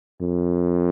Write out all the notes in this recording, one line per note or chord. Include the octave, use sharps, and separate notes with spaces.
F2